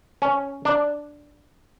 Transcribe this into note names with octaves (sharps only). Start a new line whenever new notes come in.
C#4
D4